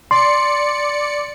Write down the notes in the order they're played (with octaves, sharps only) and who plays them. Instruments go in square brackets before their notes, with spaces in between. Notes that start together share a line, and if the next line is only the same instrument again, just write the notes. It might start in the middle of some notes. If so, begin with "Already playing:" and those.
[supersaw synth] D5 C#7 [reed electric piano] C6